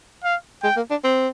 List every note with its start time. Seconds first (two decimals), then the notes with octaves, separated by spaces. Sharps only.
0.24 F5
0.63 G#3 G5
0.76 A#3
0.90 D4
1.04 C4